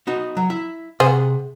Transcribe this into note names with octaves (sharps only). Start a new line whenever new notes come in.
B3 D#4 F#4
F#3
E4 E5
C3 G#4 C5 D#5 F#5